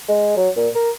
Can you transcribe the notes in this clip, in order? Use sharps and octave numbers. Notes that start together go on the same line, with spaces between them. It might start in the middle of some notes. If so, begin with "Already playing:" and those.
G#3
F#3
A#2
A#4